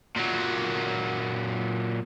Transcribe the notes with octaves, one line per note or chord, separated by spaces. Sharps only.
A#2 F#3